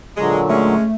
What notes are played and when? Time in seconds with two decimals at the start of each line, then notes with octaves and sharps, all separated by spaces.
0.17 A#2 D3 F#3 G#3
0.50 G#3 A3 C#4